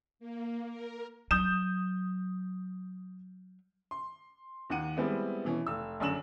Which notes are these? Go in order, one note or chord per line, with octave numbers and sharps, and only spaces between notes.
A#3
A#4
F#3 D#6 G6 E7
C6
D#2 D#3 F#5 D#7
G3 G#3 B3 C4 E4
B2 E3 C#4
F1 E6
A#1 F#2 D3 E6 E7 F#7